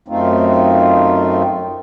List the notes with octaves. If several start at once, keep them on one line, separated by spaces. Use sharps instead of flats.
F#2 A3 C4 D#4 F4